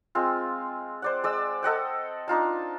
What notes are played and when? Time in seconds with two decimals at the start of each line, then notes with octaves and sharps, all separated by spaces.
0.15 G#3 C4 F4
1.02 C5 D5 F#5
1.24 G#3 D5 E6
1.63 A4 D#5 F#5 G5
2.28 D4 D#4 F4 A5